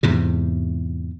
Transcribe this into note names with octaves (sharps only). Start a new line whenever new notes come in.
E2 G#2 C3